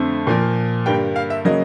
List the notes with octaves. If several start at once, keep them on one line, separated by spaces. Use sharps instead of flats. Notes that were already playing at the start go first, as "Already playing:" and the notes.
Already playing: F2 D3 A3 C4
A#2 F3 A#3
G2 D3 G3 A#3 G5
F5
E5
C#3 F#3 A#3 D#5